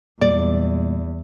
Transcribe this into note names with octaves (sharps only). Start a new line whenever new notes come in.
E2 A#2 G3 G#3 D5